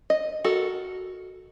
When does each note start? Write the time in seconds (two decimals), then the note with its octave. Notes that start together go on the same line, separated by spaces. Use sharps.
0.10 D#5
0.44 F#4 A4 A#4